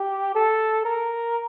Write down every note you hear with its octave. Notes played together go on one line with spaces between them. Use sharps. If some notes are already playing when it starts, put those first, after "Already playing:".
Already playing: G4
A4
A#4